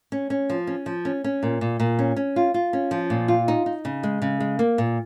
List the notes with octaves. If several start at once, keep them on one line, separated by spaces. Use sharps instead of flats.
C#4
C#4
F3
C#4
F3
C#4
C#4
A#2
A#2
A#2
C#4
C#4
F4
F4
C#4
F3
A#2
F4
D#4
D#4
C#3
G#3
C#3
G#3
A#3
A#2